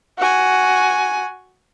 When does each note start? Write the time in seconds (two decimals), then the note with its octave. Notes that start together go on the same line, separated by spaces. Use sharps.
0.18 F#4 G#5